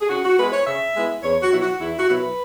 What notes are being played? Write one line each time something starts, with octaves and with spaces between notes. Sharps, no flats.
G#4
C#3 F#4
F#4
G#3 B3 E4 B4
C#5
C#3 E5
G#3 B3 E4
E2 C#5
F#4
B2 F#3 E4
F#4
E2 E4
F#4
B2 F#3 E4
B4